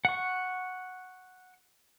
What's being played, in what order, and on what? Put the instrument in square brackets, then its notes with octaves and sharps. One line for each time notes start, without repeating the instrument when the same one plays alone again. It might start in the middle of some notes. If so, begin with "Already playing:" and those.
[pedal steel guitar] F#5 C#6